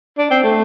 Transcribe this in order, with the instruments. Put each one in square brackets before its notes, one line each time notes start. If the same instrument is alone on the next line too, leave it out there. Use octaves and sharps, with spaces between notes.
[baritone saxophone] D4
C4
A3